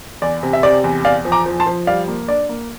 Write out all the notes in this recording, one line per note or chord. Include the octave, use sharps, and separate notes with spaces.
E2 D5
C3
E5
C3 D5
E2
E2 D5 F5
F3
A#5 D6
F3
A5 C6
F3
G3 D5 F5
A#3
D4 D5
A#3